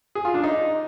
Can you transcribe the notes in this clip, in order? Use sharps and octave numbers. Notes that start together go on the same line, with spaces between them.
G#4
F4
D4
D#4